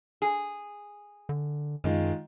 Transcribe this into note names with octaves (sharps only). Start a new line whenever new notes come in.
G#4
D3
F#2 D#3 G#3 F4